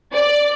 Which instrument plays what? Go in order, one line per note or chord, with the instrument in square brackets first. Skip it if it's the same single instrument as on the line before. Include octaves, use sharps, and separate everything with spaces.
[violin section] D5